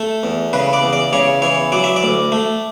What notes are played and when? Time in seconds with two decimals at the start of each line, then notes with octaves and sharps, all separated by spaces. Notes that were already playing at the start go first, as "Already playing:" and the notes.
Already playing: A3 A4
0.23 E2
0.53 C#3 B4
0.73 D5
0.83 E2
0.93 D5
1.13 C#3 C#5
1.42 E3 C#5
1.72 F#3 D5
1.84 E5
1.96 D5
2.03 D2
2.32 A3